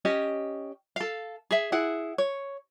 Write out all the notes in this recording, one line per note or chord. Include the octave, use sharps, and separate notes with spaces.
C#4 G4 D#5
A4 F5
G#4 E5
E4 G#4 F#5
C#5